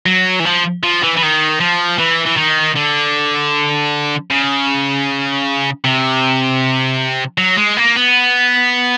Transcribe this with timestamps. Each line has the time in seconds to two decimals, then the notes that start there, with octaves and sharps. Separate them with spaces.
0.06 F#3
0.40 E3
0.45 F3
0.83 F3
1.03 E3
1.17 E3
1.22 D#3
1.61 F3
1.99 E3
2.27 E3
2.37 D#3
2.76 D3
4.30 C#3
5.84 C3
7.38 F#3
7.57 G#3
7.77 A#3
7.96 B3